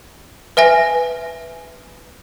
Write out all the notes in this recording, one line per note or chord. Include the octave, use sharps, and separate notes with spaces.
B4 E5 G#5 A#6